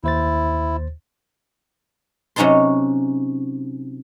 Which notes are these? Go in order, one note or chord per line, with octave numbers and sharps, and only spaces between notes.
D#2 E4 C5 A6
C3 F#3 C#4 D#4 A5 C6